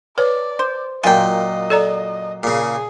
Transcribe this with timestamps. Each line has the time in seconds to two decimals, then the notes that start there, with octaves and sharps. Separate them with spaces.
0.18 B4 C#5 D5
0.59 C5
1.04 F#2 A#2 F4 D#5 G5 G#5
1.70 A4 D5 A#5
2.43 A#2 C#3 G#4